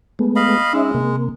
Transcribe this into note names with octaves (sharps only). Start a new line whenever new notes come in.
G#3 A3 B3
D#5 F5 B5
G#3 C#4 D#4 E5
C3 A#3